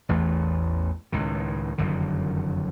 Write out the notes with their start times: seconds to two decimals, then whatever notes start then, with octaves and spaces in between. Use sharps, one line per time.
0.09 A1 E2 E3 A3
1.12 C#2 A2 D#3
1.78 F1 F#2 D3 D#3